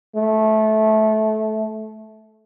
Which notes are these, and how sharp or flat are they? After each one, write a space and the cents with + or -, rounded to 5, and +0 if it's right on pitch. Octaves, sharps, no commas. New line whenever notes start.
A3 -20